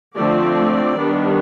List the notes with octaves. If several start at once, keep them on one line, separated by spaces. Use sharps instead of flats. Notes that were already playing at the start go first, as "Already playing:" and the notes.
D3 F3 A3 C4 D5
D#3 G3 B3 D4